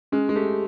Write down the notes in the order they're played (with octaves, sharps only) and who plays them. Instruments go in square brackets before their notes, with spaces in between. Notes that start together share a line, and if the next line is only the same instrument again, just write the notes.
[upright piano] G#3 [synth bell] C#4
[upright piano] G#3
[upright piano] A3 [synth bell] G4